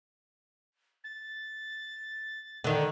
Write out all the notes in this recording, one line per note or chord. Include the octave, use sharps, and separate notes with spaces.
A6
D3 D#3